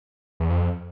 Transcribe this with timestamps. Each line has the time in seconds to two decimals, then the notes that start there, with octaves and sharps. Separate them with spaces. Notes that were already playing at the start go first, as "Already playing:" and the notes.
0.40 E2
0.50 F2